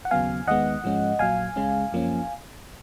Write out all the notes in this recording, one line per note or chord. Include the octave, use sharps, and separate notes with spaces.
F#5
D#2 C#3 F#3 B3 F5 G#5
D#2 D#3 G#3 B3 D#5 F#5
G#2 F3 G#3 C#4
A#1 A#2 F#3 F5 G#5
C#2 C#3 G#3 C#4
F#2 F3 A#3 C#4